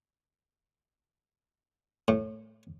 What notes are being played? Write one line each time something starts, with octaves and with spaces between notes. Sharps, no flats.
A2